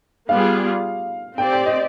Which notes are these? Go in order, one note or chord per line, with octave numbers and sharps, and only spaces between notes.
G3 B3 F4 G#4 F5
C4 G4 D5 G5
G5
D#5